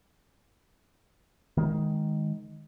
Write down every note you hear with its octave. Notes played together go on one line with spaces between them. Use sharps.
D#3 G#3